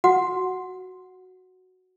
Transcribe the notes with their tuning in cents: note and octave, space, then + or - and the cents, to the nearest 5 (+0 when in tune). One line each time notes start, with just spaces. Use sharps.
F#4 +0 F#5 -5